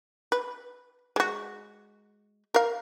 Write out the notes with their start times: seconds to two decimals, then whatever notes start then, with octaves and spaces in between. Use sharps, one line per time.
0.32 B4
1.16 G#3 F#4
2.54 A#4 F5